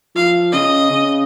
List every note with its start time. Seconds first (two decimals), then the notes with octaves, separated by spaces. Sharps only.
0.15 F3 F5
0.53 C#3 D#5
0.90 C#3